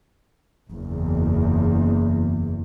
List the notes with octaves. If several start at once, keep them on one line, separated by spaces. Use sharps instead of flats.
F#1 E2